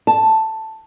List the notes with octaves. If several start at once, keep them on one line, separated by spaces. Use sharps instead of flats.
A5